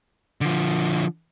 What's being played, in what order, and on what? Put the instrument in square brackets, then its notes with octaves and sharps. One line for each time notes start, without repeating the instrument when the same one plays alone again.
[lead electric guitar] D3 F3